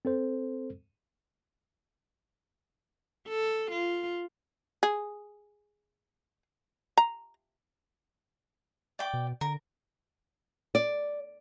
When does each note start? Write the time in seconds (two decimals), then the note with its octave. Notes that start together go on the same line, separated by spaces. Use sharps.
0.05 C4 A4 C5
3.28 A4
3.71 F4
4.83 G#4
6.97 A#5
8.99 D5 G5 D6
9.14 B2
9.41 D3 A#4
10.75 D5